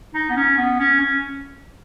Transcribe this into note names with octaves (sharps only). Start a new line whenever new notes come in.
D#4
B3
C#4
B3
C#4
C#4